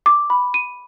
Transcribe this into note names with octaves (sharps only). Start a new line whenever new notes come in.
D6
B5
D#7